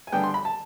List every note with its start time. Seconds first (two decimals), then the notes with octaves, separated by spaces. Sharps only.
0.07 G#5
0.12 D3 G3 B3 D4 G5
0.24 C6
0.34 B5
0.45 A5